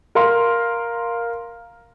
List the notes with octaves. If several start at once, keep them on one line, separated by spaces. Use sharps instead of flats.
A#4 F5 C6 F6